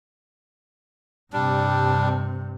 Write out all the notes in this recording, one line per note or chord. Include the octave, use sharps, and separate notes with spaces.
G2 C3 G3 D4